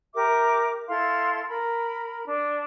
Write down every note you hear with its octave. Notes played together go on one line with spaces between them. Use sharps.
G4 A#4 E5 D6
E4 A4 F5 C6
A#4 B5
D4